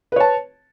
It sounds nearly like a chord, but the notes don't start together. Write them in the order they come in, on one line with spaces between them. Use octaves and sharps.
B4 C#5 A5